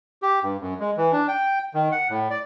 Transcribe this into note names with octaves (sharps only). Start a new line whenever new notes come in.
G4
G2
F#2
G#3
E3
D4
G5
D#3
F#5
A2
D5